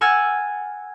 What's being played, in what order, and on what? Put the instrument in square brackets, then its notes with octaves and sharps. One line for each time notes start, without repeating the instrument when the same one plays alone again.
[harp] F#5 G#5 E6 F6 G#6 A6